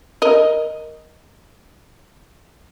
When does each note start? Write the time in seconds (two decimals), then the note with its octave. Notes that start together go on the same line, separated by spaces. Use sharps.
0.22 A#4 D#5